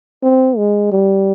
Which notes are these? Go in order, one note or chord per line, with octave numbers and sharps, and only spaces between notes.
C4
G#3
G3